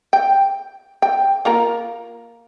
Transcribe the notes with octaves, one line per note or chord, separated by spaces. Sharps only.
G5
G5
A#3 F4 A#4